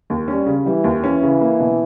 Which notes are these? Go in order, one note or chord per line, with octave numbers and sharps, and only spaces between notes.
D#2
G3 C#4
C#3
E3 G3
D#2
E3 C#4
C#3
A#3
B2